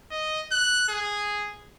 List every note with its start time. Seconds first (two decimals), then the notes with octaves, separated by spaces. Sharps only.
0.11 D#5
0.52 F#6
0.89 G#4